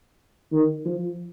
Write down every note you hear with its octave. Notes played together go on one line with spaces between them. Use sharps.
D#3
F3